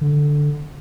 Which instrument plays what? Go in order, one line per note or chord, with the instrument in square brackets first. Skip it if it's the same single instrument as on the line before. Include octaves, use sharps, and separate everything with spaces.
[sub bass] D3